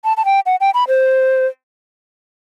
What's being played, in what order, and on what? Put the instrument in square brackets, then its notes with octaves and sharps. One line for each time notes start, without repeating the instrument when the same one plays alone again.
[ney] A5
A5
G5
F#5
G5
B5
C5